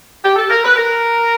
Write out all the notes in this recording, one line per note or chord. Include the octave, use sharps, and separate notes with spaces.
G4
A4
A#4
B4
A#4